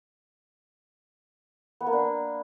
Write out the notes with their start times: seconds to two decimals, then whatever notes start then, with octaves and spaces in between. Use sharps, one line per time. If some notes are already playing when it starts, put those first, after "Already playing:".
1.81 B3
1.87 A#3
1.93 D4